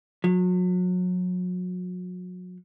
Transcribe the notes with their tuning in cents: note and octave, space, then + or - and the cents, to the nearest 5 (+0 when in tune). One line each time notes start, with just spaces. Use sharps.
F#3 -35